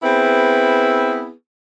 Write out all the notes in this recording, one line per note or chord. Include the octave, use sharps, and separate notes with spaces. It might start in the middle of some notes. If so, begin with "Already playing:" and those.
B3 C4 E4 G#4 B4